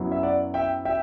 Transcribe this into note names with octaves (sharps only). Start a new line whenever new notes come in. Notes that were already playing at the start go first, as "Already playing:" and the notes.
Already playing: F#2 F#3 B3 E4
E5
D5 F#5
E5 G5
E5 G5